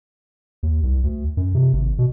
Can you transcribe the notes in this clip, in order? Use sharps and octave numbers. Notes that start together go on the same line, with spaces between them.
D#2
C2
D2
F#2
C3
G#1
B2